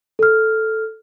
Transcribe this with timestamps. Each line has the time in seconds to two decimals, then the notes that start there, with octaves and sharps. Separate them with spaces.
0.19 A4 F6